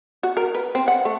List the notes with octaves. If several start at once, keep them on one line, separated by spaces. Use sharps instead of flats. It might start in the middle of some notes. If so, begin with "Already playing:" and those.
F#4
A#4
B4
C4
F#5
A3